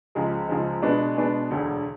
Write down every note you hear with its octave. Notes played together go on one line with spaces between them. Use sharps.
C#2 C#3 F3 G#3
C#2 C#3 F3 G#3
B2 G#3 B3 D4
B2 G#3 B3 D4
E1 D2 D3